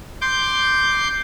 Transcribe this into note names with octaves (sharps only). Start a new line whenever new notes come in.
C6 D6 G6